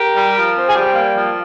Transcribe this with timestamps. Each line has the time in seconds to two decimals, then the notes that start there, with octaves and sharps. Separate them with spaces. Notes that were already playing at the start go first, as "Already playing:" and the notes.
Already playing: G4 A#4
0.13 G3
0.34 F3
0.54 C4
0.67 G#4
0.73 G3 G4
0.94 A#3
1.14 F3